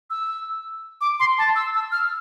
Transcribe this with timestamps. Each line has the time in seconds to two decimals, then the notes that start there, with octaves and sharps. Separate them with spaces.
0.10 E6
1.01 D6
1.19 C6
1.38 A5
1.56 E6
1.74 E6
1.92 F6